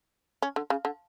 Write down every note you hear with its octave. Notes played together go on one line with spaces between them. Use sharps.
C#4
D3
C#3
D3